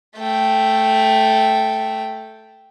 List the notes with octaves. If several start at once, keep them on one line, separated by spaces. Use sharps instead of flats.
A3 G5